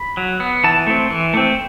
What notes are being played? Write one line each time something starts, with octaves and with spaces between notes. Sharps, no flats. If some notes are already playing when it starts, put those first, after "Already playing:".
Already playing: B5
F#3
B3
E3 A5
A3 C4
E3
A3 C4